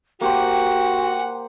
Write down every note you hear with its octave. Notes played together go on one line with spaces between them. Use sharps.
A#3 F#4 G4 C5 F#5 G5